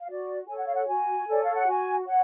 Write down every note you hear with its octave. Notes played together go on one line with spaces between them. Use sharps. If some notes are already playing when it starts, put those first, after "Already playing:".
F5
F#4 D5
A4 C#5 G#5
F#5
F5
F#5
F#4 G#5
A4 C#5 D5
F5
F#5
F#4 G#5
C#5 F#5